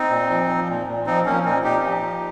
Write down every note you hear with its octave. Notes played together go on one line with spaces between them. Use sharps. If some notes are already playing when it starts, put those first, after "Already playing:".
Already playing: C4 D#4
A#2
F3
F3
A#2
A#2
F3 C4 D#4
F3 A#3 C#4
A#2 C4 D#4
A#2 D#4 G4
F3
F3